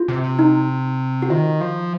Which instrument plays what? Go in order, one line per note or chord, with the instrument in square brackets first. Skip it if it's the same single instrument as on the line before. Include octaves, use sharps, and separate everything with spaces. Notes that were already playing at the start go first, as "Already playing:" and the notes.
Already playing: [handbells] F4
[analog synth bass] C3
[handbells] D#4
F#4
[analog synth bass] D#3 [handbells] F4
[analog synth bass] F3